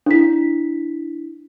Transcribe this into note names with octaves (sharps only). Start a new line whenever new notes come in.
D4 E4 B6